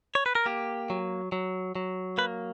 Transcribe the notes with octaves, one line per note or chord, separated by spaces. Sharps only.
C#5
B4
A#4
A#3 G4
F#3
F#3
F#3
A#3 B4